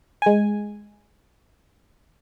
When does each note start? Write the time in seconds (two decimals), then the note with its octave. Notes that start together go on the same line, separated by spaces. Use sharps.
0.22 G#3 G#5